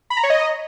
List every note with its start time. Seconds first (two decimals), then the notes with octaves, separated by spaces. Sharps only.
0.10 B5
0.17 A#5
0.23 C#5
0.30 D#5